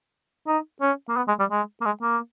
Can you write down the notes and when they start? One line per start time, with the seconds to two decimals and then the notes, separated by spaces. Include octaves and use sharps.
0.47 D#4
0.81 C#4
1.09 A#3
1.17 B3
1.28 G#3
1.39 G3
1.51 G#3
1.81 A#3
1.85 G#3
2.02 A#3